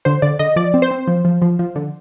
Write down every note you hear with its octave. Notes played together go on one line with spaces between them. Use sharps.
D3 C5
D3 D5
D3 D#5
F3 D5
C4
C5
C4
F3
F3
F3
F3
D3